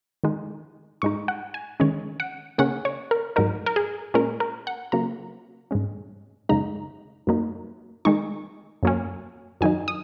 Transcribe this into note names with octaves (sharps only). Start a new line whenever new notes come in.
D#3 G#3 D#4
G#2 G#3 D#4 C#6
F#5
G#5
D#3 G#3 C#4 C#5
F#5
C#3 A#3 C#4 F#5
C#5
A#4
G#2 F#3 D#4 A#4
A#4
G#4
A#2 G#3 C#4 A#4
A#4
F#5
C#3 F#3 A#3 A#5
G#2 G#3 C#4
F#2 C#3 G#3 D#4 A#5
F#2 F#3 A#3 D#4
D#3 G#3 D#4 C#6
F#2 F#3 A#3 C#4
F#2 D#3 F#3 D#4 G#5
D#6